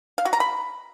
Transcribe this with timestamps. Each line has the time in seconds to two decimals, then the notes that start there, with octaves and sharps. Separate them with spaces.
0.18 F5
0.25 F#4
0.33 A#5
0.40 B5